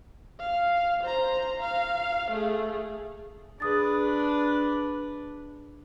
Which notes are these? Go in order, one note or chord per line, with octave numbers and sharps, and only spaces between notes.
F5
C5 A#5
F5
A3 G#4
D4 G#4 B4 D#6 A6